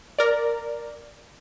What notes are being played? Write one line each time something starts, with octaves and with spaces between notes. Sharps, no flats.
A#4 D5